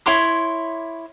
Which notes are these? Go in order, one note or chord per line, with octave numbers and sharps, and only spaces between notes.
E4 C#5 C6 D6